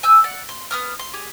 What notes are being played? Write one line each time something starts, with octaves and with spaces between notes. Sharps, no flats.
G#5 E6 G6
D5 F#5
C6
B3 D#6 F6
C6
G4 G#4